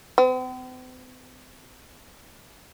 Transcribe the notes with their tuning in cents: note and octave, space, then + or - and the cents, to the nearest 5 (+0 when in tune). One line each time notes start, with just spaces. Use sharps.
C4 -45